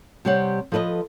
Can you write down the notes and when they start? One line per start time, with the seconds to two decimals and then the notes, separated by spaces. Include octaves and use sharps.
0.25 C3 G3 G4 C5 C#5 F#5
0.72 F3 A4 B4 D5 D#5